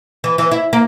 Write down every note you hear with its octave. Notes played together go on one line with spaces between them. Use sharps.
E3
E3
E4
A#3